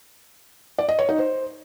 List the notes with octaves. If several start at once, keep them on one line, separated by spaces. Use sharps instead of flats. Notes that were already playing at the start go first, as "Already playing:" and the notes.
D5
D#5
C#5
D#4
C5